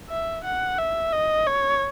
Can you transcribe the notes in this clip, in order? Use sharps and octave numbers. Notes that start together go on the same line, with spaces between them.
E5
F#5
E5
D#5
C#5